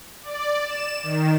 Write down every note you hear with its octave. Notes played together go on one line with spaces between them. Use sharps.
D5
E7
D#3